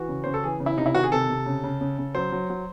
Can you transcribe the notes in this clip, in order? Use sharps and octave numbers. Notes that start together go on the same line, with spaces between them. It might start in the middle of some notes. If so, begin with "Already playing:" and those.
Already playing: E3 F#4
C#3
C#3 C5
A4
E3 G#4
C#3
E4
C3 D#4
E4
D#3 F#4
G#4
C3 A4
C3
C#3
C#3
C#3
C#3
F#3 C5
F#3
F#3